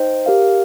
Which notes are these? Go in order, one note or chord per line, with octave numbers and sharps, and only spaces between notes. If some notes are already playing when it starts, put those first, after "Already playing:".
Already playing: D#4 C5 D#5 G5
G4 A#4 F5